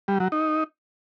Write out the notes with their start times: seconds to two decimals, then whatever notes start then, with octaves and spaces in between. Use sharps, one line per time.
0.08 G3
0.20 F#3
0.32 D#4